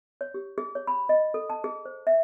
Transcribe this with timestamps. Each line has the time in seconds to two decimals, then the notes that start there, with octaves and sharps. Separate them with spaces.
0.21 C#5
0.34 G4
0.58 G#4
0.75 C#5
0.87 B5
1.09 D#5
1.34 A4
1.50 A5
1.64 G#4
1.85 C5
2.07 E5